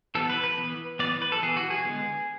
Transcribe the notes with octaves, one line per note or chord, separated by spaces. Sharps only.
E3 B3 A4
B4
B4
E3 B3
E3 B3 D5
B4
A4
E3 B3 G#4
F#4
G#4
D3 G#3 B3